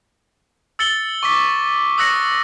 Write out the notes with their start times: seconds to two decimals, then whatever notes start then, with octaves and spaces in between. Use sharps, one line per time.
0.79 E6 A6 C#7 G7
1.23 C#6 D6 B6
1.98 D#6 E6 F#6 A#6 C#7